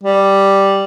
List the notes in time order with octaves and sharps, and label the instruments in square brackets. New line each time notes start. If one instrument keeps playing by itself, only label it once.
[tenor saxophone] G3